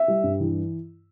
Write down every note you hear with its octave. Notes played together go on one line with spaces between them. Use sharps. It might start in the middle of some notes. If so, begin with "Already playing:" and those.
Already playing: E5
G3
G2
E3